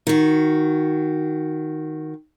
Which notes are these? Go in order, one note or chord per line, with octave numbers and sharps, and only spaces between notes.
D#3 F#4